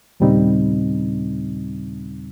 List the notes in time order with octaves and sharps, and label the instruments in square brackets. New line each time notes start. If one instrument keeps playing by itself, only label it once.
[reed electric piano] D#2 A#2 C#3 G3 C4 D#4